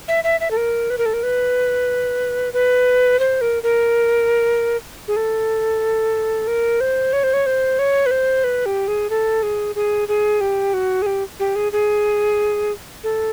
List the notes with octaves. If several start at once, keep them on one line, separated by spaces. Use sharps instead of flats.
E5
E5
E5
A4
A#4
B4
A#4
A4
A#4
B4
B4
C5
A#4
A#4
G#4
A4
A#4
C5
C#5
C5
C#5
C5
C#5
B4
C5
B4
G4
G#4
A4
G#4
G#4
G#4
G4
F#4
G#4
G4
G4
G#4
G#4
A4